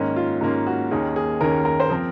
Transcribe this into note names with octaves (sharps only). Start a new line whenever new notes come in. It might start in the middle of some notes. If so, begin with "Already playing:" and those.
Already playing: G#2 D#3 A#3 C#4
F4
G#2 D#3 A#3 C#4
F#4
D#2 D#3 A#3 C#4 G#4
G#4
D#2 D#3 A#3 C#4 A#4
A#4
C5
F3 C4 A#4